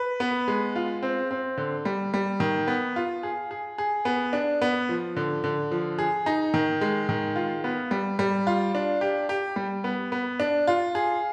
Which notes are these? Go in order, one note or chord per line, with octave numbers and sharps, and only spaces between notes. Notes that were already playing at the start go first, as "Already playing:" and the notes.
Already playing: B4
B3
G#3
F4
C4
C4
D3
G3
G3
D#3
B3
F4
G#4
G#4
G#4
B3
D4
B3
F3
D3
D3
F3
G#4
D#4
D#3
G#3
D#3
F4
B3
G3
G3
F4
D4
G4
G4
G3
B3
B3
D4
F4
G#4